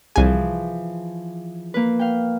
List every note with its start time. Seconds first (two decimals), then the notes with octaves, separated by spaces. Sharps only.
0.16 C2 E3 F3 G#4 G#5
1.74 A#3 B4
1.99 F5 G5